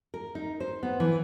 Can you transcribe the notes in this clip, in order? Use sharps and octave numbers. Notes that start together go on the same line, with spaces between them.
A#4
D#4
C5
B3
E3